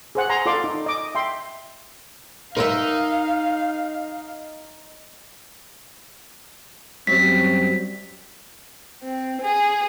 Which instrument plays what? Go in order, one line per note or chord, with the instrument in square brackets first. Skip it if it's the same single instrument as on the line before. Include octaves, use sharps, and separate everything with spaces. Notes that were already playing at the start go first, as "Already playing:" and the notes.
[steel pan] G#4 C5 F#5
G#5 A#5 C6
F4 A4 D5 C6 D6
D#4
D#5 D6
E5 G5 C6
[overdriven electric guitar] D#4 [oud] A#4 B4 E5 [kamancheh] F5
[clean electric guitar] F#2 F#3 G3 [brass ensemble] C4 [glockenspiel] B6
[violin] C4
G#4